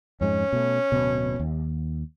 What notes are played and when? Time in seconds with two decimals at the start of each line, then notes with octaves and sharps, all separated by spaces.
0.21 F2 G#2 G#3 C#4
0.53 B2 A3
0.92 D1 B2
1.40 D#2